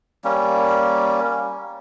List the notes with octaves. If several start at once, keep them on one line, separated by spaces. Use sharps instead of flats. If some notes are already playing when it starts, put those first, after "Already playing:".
G3 A#3 C#4